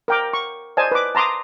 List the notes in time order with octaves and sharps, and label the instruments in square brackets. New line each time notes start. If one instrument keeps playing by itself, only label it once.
[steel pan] A#4 G5 D6
C#6
C5 D5 D#5 G#5 A5
B4 D6
A5 A#5 C6 D6 D#6